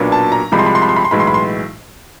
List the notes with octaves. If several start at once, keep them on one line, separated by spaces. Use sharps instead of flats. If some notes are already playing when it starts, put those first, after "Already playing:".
Already playing: B1 A#2 F#3 B3 D4
A5
A#5
C2 C3 F3 G#3 B5
C6
B5
C6
B5
C6
B5
C6
B1 A2 E3 G#3 B5
C6
B5
C6